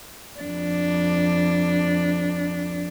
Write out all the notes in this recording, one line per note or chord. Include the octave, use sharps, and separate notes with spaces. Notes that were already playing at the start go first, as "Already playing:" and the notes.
F2 D4